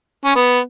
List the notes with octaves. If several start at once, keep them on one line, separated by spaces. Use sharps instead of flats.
C#4
B3